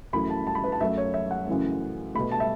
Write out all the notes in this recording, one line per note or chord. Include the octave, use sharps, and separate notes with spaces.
F#2 E3 A3 B5
A5
A5
B5
B4
A5
F#2 F#3 A3 E5
C#5
E5
F#5
F#2 C#3 E3 A3
B2 A3 B5
A5
E5